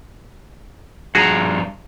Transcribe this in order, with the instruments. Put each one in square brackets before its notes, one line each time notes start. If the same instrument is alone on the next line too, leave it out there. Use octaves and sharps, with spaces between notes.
[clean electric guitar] G2 F3 A#5 [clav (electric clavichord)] F#4 G#4